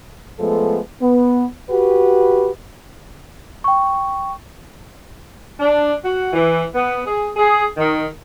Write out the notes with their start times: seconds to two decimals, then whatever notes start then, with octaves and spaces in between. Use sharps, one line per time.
0.39 F3 G#3 A3 B3 A4
1.02 B3
1.70 F#4 G4 B4
3.64 G5 C#6
5.60 D4
6.05 F#4
6.33 E3
6.75 B3
7.07 G#4
7.36 G#4
7.77 D#3